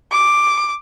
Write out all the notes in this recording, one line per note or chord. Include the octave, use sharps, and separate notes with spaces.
D6